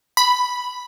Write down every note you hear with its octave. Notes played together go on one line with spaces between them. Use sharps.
B5